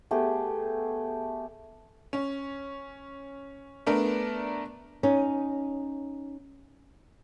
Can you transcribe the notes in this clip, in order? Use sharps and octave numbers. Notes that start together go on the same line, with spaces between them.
A3 B3 G4 G#4
C#4
A3 B3 D4 A#4
C#4 D#4